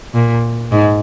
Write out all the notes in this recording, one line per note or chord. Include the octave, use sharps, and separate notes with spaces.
A#2
G#2